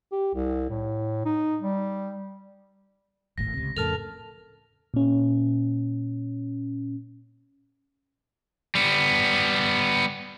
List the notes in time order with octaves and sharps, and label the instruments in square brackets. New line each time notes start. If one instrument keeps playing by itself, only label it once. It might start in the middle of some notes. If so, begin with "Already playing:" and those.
[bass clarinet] G4
C2
A2
D#4
G3
[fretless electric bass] D#1 G#1 A2 [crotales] A#6
[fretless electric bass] C#2 C3
[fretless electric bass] F2 A2 C#3 [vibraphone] A4 A#4 A5 [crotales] F6 F7
[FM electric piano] A#2 C#4
[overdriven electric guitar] G3 B3